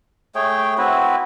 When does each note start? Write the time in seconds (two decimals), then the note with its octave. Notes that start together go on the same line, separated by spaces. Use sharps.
0.35 A3 G#4 C#5 G5
0.78 C4 E4 F#4 B4